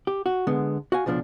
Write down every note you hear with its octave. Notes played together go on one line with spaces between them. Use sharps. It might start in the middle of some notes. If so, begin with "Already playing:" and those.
G4
F#4
D3 G#3 B3
F#4 F5 G#5
C#2 B2 F3 D4 C5